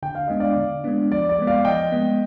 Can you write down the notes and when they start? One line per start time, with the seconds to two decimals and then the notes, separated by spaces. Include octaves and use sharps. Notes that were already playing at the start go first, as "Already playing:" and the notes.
0.03 D3 G5
0.15 F5
0.28 G#3 B3 D4 D#5
0.40 D5 F5
0.57 D3
0.84 G#3 B3 D4
1.11 F3 D5
1.29 D5
1.39 G#3 B3
1.47 D5 F5
1.65 F3 D#5 G5
1.92 G#3 B3